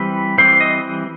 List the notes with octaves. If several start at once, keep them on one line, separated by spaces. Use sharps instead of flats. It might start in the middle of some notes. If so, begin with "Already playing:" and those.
Already playing: E3 G3 C4 B4
E3 G3 C4 C5
D#5